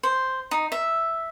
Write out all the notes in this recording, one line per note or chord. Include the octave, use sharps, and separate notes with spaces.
C5
D#4
E5